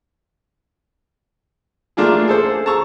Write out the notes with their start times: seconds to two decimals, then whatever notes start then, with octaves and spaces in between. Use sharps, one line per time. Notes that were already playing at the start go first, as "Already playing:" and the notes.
1.97 A3 A#3 D4 F4 G#4
2.28 G#4 A4 C5
2.66 A5 A#5 C#6 E6